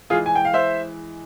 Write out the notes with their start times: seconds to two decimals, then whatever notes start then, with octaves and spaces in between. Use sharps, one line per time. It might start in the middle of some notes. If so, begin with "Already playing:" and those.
0.10 E3 G#3 F4 G#4
0.26 G#5
0.35 G5
0.45 F5
0.54 C5 E5